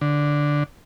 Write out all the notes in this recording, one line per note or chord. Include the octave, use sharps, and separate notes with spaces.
D3